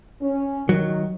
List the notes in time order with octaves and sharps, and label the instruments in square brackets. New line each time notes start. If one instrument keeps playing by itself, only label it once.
[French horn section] C#4
[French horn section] D#3 [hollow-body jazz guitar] F#3